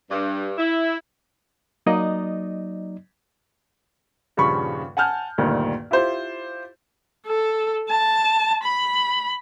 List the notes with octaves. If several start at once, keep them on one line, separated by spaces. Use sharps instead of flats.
G2
E4
F#3 A#3 D#4 D5 D#5
D#1 G2 C#3 F3 B5 C#6
F#5 G#5 A5 F6 G6
D2 G2 A#2 D#3
E4 F4 G4 C5
A4
A5
B5